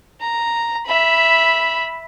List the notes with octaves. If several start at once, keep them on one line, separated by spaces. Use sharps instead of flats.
A#5
E5 B5